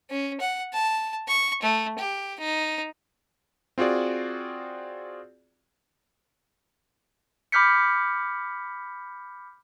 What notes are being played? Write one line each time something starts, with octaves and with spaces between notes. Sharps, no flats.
C#4
F#5
A5
C#6
A3
G4
D#4
C4 F4 F#4 G#4 D5
B5 D6 F6 G6 B6 C#7